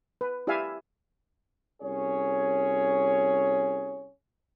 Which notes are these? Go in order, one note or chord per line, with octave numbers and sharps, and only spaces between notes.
B4
E4 G4 D5 E5 F5 G#5
C2 C#4 G#4 C#5